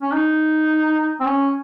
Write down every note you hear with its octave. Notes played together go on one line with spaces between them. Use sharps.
C#4
D#4
C4
C#4